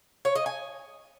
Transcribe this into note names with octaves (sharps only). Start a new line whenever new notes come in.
C#5
D#5
G#5